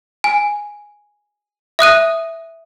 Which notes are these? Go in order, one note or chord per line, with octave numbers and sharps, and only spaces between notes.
G#5
E5 D#6 F#6 D#7